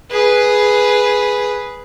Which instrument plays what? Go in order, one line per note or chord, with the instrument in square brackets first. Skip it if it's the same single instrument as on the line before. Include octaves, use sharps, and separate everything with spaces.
[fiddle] G#4 B4